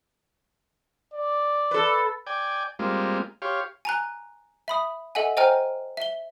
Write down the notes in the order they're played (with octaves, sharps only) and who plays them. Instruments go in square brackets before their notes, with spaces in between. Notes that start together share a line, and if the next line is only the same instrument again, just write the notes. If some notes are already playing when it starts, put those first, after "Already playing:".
[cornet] D5
[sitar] A4 B4
[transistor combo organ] D5 G5 G#5
G3 G#3 A#3 C4 F4
G4 C#5 F5 C6
[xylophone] G#5 A#5 F#6
E5 B5 D#6
A4 D#5 E5 F#5 G#5
C5 D#5 G5 G#5 A#5 F6
E5 G7